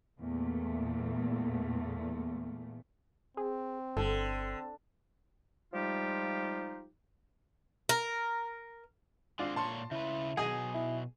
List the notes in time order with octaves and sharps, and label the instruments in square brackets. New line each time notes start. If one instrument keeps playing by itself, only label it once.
[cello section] E2 A#2 A3
[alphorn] C4 [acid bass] G#4
[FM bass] G1 [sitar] D3 [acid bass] A4
[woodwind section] F3 G3 G#3 D#4 F4 G4
[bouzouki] A#4
[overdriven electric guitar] G#3 C4 [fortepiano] D4 F4
[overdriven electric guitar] A#2 C#5 [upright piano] A5 C6
[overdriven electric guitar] C#3 B4 [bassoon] E4
[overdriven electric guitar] B2 F#3 [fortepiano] G#4 D#5 G#5
[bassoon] E4